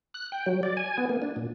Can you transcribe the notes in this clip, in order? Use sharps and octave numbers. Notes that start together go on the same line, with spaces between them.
F#6
G5
F#3
D5
G#5
B3
A#3
D4
A#2